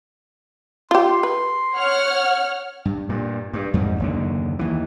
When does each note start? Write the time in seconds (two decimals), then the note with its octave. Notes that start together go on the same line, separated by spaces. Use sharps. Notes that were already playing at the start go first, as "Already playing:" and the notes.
0.91 F4 G4 C6
1.23 B4
1.74 C#5 F#5 F6
2.85 G2
3.09 G2 A#2
3.53 G2
3.74 F2 G#2 F#3 G3
4.00 F#1 D#2 D3
4.59 D#2 E3